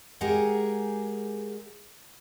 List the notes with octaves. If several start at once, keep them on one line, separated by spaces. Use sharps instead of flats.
G#3 G4 G#4 A#4 F#5